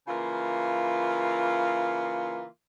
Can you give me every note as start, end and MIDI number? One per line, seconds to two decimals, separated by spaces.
0.08 2.44 49
0.08 2.44 52
0.08 2.44 58
0.08 2.44 65